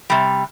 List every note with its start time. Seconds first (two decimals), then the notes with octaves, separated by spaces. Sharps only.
0.10 C3 G3